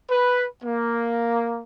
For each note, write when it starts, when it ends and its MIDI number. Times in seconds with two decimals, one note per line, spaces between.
0.10 0.45 71
0.63 1.62 58